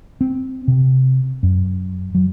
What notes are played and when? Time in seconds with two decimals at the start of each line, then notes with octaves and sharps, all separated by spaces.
0.21 C4
0.68 C3
1.43 F#2
2.15 F#3